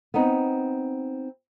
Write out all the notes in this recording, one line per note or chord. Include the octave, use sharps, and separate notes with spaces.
B3 C4 D#4